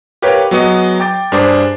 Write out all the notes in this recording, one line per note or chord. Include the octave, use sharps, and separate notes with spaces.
G4 A#4 B4 C#5 F5 G5
F#3 B3 G#4 D#5 C#7
G5 D6 A6
G2 D4 G#4 C5 A5 D6